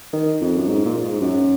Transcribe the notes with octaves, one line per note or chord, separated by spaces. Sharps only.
D#3
F2
F#2
G#2
A#2
G#2
F#2